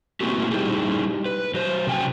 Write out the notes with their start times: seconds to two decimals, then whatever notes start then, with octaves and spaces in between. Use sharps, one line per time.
0.21 A3 A#3 C4 E4 F#4 G4
0.51 G3 D#4 E4 G4 G#4
1.26 B4
1.54 F#3 C5
1.87 C3 F#3 G5 G#5